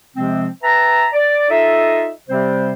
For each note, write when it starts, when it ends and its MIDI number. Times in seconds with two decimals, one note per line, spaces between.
0.15 0.46 48
0.15 0.46 53
0.15 0.46 56
0.15 0.46 60
0.62 1.05 71
0.62 1.05 76
0.62 1.05 79
0.62 1.05 81
0.62 1.05 82
1.12 1.47 74
1.49 2.10 63
1.49 2.10 65
1.49 2.10 69
1.49 2.10 75
1.49 2.10 76
2.28 2.72 48
2.28 2.72 55
2.28 2.72 60
2.28 2.72 72